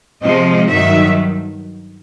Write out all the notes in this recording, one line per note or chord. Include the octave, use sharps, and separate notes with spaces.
C3 F3 G#3 D#5
G2 D#3 F#3 E5